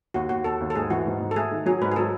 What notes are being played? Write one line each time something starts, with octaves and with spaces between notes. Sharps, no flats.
D#2 F#4
D#2 F#4
D#2 A4
D#2
A4
G#2 G#4
E3 F#4
G#2
G#2
A4
A3 G#4
D#3
F#3 G#4
G#2 B4
G#4
F#3 A4